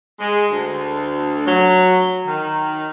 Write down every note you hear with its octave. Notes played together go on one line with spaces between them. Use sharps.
G#3
D2
F#3
D#3